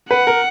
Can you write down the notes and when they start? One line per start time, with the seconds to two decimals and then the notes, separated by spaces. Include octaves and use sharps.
0.10 B4 F#5
0.27 A#4